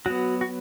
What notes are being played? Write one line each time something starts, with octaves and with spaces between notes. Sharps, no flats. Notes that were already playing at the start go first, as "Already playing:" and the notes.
F#3 B3 F#4
F#4